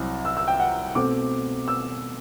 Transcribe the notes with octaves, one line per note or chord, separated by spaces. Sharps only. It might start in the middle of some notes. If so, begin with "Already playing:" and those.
Already playing: C2 C3 F#3 C4
E6
E6
G5
F#5
B2 A3 C4 D6
E6